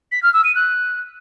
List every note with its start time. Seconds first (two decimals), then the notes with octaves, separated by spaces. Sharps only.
0.12 B6
0.23 F6
0.34 E6
0.44 D#7
0.55 F#6